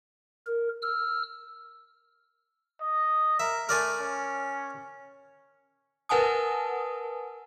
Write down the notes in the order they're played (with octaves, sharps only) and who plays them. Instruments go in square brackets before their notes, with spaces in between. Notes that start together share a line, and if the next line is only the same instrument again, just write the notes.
[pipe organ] A#4
E6 F6
[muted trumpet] D#5
[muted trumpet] A#4 [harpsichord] E5
[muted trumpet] A3 [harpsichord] A#4 D5 G#5
[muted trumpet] C#4
[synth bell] A#4 B4 F#5 G#5 A5 D#6